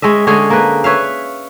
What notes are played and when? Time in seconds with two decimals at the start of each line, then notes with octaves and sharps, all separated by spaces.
0.02 G#3 C#4 D#5 E5
0.27 D3 G#3 C#4 G#4
0.50 A#3 B4
0.84 B4 C#5 E5 F5